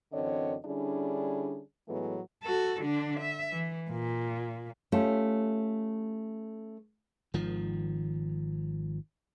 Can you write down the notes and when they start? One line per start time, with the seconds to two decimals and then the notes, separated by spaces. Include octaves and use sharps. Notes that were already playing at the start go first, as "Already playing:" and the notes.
0.12 F#2 D3 E3 C4 C#5 D#5
0.65 D3 G3 C#4 D4 E4 G#4
1.88 A2 E3 F#3 G#3 A3 B3
2.44 F#4 A4
2.82 D3 D4
3.20 E5
3.52 E3
3.91 A#2
4.92 A3 C#4 F4 G4 A4
7.34 G#1 D#3 F3